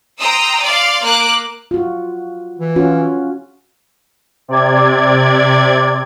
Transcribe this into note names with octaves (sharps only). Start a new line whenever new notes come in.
G5 A#5 C6 D#6 E6
D5 F5 C6
A#3 D6 F#6
F4 F#4
E3
C#4 F4 F#4
C3 D5 G#6